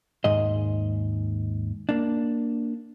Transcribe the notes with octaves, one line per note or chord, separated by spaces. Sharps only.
D#2 G#2 G#4 D#5
A#3 D4